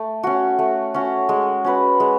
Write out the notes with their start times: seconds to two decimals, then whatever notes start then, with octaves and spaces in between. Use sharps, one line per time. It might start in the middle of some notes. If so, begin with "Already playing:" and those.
Already playing: A3
0.23 C#4 F#4
0.59 A3
0.94 C#4 F#4
1.29 G#3
1.64 C#4 F#4 B4
2.00 G#3